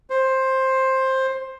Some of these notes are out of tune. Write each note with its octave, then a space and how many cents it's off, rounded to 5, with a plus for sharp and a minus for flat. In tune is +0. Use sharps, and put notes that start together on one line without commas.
C5 +10